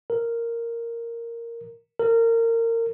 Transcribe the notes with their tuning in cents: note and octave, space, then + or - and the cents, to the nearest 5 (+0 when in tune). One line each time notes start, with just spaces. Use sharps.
A#4 -5
A#4 -25